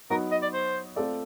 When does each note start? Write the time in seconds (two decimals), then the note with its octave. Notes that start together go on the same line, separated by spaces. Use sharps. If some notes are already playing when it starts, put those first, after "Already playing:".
0.10 F#3 B3 D#4 F#4 A#4
0.32 D#5
0.42 D5
0.53 C5
0.96 A3 C4 F4 A4 D5